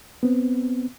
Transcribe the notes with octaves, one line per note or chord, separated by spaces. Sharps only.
B3 C4